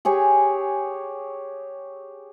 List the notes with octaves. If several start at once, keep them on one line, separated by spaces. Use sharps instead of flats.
G4 G#4 C#5